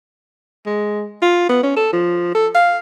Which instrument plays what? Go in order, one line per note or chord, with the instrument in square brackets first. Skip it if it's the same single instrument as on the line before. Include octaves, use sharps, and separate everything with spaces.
[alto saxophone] G#3
F4
B3
C#4
A4
F3
A4
F5